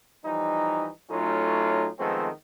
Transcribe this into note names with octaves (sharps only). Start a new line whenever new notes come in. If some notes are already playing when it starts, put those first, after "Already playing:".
E3 F3 G3 D#4
A2 F#3 A3 C#4 D#4 F4
D#3 F3 G#3 A3 B3 C4